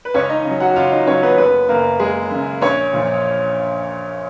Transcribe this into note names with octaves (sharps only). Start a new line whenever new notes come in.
B4
C#2 C#4 C#5
D#4 D#5
C#3 F#3
F#4 F#5
C#2 F4 F5
D#4 D#5
C#3 F#3 C#4 C#5
B3 B4
F#1 B3 B4
F#2 C#3 A#3 A#4
F#1 G#3 G#4
F#2 C#3
A#1 C#4 C#5
A#2 F3